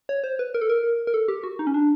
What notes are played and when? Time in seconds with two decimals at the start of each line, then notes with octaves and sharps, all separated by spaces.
0.09 C#5
0.24 C5
0.39 B4
0.54 A#4
0.61 A4
0.69 A#4
1.07 A#4
1.14 A4
1.28 G4
1.44 F#4
1.59 D#4
1.67 C#4
1.74 D4